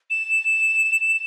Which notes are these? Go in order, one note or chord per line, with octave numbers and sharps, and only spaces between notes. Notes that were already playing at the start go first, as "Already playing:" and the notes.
E7